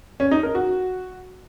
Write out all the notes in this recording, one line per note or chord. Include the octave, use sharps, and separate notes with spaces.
C#4
D#4
A#4
F#4